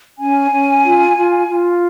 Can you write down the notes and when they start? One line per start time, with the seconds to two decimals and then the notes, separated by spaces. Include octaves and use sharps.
0.17 C#4 G#5
0.51 C#4
0.84 F4
1.17 F4
1.49 F4